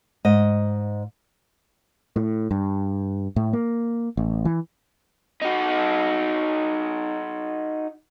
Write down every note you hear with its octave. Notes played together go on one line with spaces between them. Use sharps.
G#2 D#5
A2
G2
A2
A#3
A1
E3
D#4 F#4